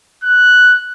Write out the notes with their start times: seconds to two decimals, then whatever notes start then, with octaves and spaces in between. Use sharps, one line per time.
0.24 F#6